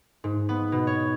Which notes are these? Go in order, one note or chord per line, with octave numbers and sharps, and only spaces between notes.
G#2
B3
B2
C#5